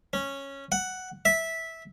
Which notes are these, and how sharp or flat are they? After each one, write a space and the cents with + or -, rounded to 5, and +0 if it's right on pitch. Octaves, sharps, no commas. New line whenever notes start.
C#4 -10
F#5 +5
E5 -10